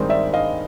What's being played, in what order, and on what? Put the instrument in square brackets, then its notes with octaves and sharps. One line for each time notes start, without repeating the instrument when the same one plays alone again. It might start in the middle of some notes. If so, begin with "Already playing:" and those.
Already playing: [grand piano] G2 D#3 G#3 C4 D#4
[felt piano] D5 E5
D#5 F5